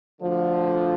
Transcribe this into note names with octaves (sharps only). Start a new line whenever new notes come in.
D2 D3 F3